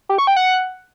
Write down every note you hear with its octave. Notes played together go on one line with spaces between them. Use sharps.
G4
C#6
G5
F#5